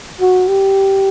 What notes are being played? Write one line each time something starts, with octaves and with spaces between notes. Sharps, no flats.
F#4
G4